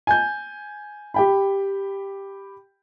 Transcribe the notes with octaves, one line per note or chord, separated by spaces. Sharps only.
G#5 G6
G4 G5 B5